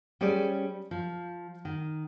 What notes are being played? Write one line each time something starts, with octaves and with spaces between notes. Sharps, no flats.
G3 C#4 G#4 C5 D5
F3
D#3